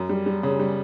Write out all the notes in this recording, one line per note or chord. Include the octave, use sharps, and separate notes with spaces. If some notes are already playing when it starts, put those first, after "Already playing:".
Already playing: F#2
G3
G3
C#3
G3